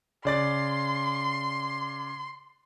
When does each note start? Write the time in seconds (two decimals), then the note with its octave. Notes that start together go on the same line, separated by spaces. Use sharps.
0.25 C#3 D5 C6 A6